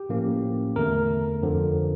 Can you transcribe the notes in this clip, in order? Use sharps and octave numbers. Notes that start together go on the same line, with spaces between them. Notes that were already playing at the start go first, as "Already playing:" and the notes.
Already playing: G4
A2 F3 A#3 C#4
E2 D3 A3 A#4
F2 D3 F3